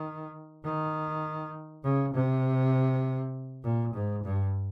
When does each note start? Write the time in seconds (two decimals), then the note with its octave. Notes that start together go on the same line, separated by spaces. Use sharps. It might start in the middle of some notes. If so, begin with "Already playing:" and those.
Already playing: D#3
0.64 D#3
1.84 C#3
2.14 C3
3.64 A#2
3.94 G#2
4.24 G2